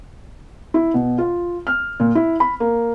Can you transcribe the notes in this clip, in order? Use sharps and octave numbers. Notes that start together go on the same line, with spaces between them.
E4
B2
F4
F6
A#2
E4
B5
A#3